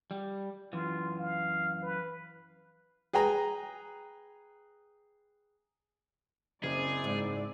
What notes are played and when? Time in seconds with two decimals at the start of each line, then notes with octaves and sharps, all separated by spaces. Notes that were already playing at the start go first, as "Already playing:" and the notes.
0.11 G3
0.73 F#2 E3 F4
1.18 F5
1.83 B4
3.13 G#4 B4 G5 G#5 A#5
6.64 F#1 C4 E4 G#4 D5
7.04 G#2